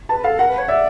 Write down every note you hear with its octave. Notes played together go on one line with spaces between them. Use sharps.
B4 A5
A4 F5
A#4 F#5
B4
C#5
D5 E5